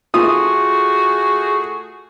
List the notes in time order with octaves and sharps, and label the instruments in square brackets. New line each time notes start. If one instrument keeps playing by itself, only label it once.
[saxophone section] A3 F#4 G#4 [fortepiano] F4 D#6